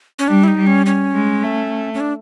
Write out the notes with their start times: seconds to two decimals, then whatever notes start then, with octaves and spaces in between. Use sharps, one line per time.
0.19 C#4
0.28 G3 D4
0.44 E4
0.48 D#4
0.57 G3
0.67 C#4
0.86 C#4
1.14 G#3
1.43 A3
1.94 C#4
2.00 D4